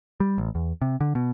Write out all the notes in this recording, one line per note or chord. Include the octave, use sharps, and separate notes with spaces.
G3
A1
E2
C3
D3
B2